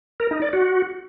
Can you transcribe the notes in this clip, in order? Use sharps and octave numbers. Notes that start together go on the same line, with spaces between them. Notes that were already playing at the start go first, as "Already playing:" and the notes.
A#4
D#4
D5
F#4